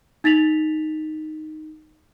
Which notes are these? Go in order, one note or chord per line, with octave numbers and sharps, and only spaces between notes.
D#4 A6 B6 F7 F#7